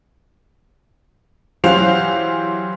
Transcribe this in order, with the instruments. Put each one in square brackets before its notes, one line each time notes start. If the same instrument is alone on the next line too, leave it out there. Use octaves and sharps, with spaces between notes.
[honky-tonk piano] E3 F#3 G4 C5 F5 F7